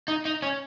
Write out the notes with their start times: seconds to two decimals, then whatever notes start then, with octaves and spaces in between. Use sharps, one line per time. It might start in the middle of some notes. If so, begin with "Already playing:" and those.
0.08 D#4
0.25 D#4
0.42 C#4